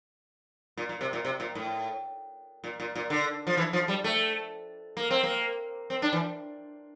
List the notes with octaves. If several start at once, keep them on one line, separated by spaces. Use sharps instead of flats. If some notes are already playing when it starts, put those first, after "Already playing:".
A#2
A#2
C3
A#2
C3
A#2
A2
A#2
A#2
A#2
D3
F3
E3
F3
G3
A3
A#3
C4
A#3
C4
D4
E3